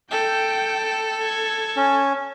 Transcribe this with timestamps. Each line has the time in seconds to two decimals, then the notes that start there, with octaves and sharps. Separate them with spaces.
0.12 A4 G5 G6
1.23 G#6
1.76 C#4